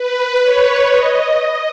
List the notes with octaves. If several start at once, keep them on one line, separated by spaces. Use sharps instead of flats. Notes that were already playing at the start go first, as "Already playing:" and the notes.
Already playing: B4
C#5
D#5